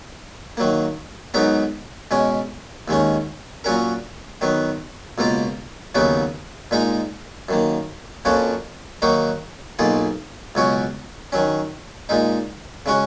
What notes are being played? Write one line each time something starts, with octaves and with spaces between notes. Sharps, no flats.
D#3 F#3 A#3
G#2 F#3 B3 D#4 A#4
B2 G#3 C#4
D#2 D#3 G#3 C#4
A#2 F#3 C#4 F#4 A#4
D#3 F#3 B3
C#2 B2 A#3 F4 A#4
D#2 C#3 F#3 B3 D#4
A#2 G#3 D#4 A#4
F#2 D#3 A#3
F2 F3 A#3 C#4 F#4
D#3 F#3 A#3 D#4 F#4
B1 B2 A#3 F4 G#4
C#2 B2 F#3 C#4 F#4
D#3 F#3 C#4
A#2 G#3 D#4
C#3 G#3 C#4 F#4